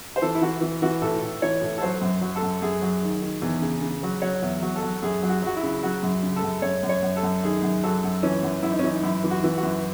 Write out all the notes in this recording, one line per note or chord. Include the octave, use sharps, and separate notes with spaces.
C5
E3 A4
E4
E3 F#4
E3
E3 F#4
A2 A4
A2
E3 C#5
A2
A4
F#3 C5
F#2
F#3
A4
F#2
F#2 G#4
F#3
D#3
D#3
E2
C#3
C#3
F#3
F#3 C#5
E2
F#3
A4
F#3
F#2 G#4
F#3
F#4
F#3 F#4
E4
C#3
F#3 F#4
F#2
C#3
A4
F#2
F#2 C#5
F#2
C#5
F#2
A4
F#2
D#3 G#4
F#2
F#3 A4
F#2
E3 C#4
F#2
F#2 E4
D#4
C#4
E3 D#4
F#2 E4
E3
F#4
E3
F#4
F#2